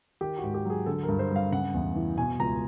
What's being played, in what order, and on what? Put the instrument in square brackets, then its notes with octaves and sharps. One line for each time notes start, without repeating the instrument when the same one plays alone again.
[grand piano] D#3 G4
F#4
G#2
G4
F#3 G#4
D3 A4
A#4
G2
C5
G3 F5
C#3 F#5
E2
E3
B2 G#5
C#2 A#5